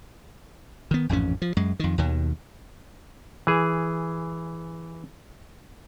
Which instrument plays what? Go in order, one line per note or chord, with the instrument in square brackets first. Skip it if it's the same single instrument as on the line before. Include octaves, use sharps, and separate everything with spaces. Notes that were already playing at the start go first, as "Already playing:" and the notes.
[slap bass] D#3 B3
A1 F2 G#2 C#4
F3
F#2 G#3
F2 D#3
D#2 B2 D#3
[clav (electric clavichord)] E3 G#4